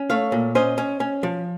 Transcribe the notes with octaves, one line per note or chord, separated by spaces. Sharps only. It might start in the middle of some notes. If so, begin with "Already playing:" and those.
Already playing: C#4
A3 C#5 F5
A#2
C#4 C5 D#5
C#4
C#4
F3